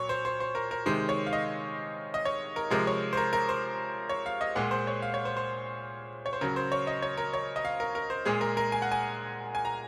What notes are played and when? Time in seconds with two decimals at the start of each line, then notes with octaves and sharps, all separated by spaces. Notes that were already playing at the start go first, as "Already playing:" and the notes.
Already playing: A#2 F#3 C#5
0.09 C5
0.25 C5
0.40 C5
0.55 A#4
0.71 A#4
0.86 C3 D#3 G#3 C5
1.09 C#5
1.26 F5
1.33 D#5
2.14 D#5
2.25 C#5
2.56 A#4
2.71 C3 F3 G#3 A#4
2.87 C#5
3.13 C5
3.17 A#4
3.33 A#4
3.49 C5
4.09 C#5
4.26 F5
4.41 D#5
4.55 A#2 G#3 F#5
4.71 C5
4.87 C#5
5.02 F5
5.14 C#5
5.25 C5
5.37 C5
6.26 C#5
6.33 C5
6.41 C#3 F#3 A#4
6.56 C5
6.72 C#5
6.87 D#5
7.02 C#5
7.17 A#4
7.34 C#5
7.56 D#5
7.65 F5
7.80 A#4
7.95 A#4
8.10 C5
8.25 A#2 G#3 G#4
8.41 A#4
8.57 A#4
8.72 G#5
8.82 F#5
8.92 G#5
9.55 G#5
9.65 A#5